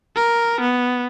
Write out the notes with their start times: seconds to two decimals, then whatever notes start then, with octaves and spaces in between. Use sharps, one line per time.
0.16 A#4
0.61 B3